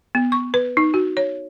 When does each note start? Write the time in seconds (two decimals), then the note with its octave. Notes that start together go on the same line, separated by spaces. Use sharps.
0.15 B3
0.32 C#6
0.54 B4
0.77 D#4
0.94 F#4
1.17 C#5